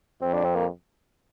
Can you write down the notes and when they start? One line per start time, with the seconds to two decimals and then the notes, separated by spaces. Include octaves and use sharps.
0.22 F2 C4
0.33 D4
0.45 C4
0.55 A#3